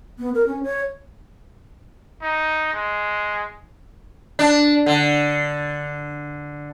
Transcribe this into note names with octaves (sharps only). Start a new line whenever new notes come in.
B3
A#4
C#4
C#5
D#4
G#3
D4
D3